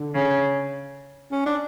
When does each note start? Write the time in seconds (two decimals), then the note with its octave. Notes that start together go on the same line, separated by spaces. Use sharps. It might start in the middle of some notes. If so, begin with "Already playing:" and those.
Already playing: D3
0.14 C#3
1.32 C#4
1.46 D4